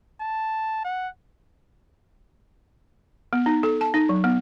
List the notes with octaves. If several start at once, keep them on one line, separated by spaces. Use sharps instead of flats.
A5
F#5
B3
D#4
A4
A5
D#4
F#3
B3